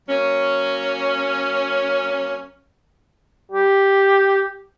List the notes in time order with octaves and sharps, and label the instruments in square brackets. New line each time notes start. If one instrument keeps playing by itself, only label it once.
[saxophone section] F#3 A#3 C#4
[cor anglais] G4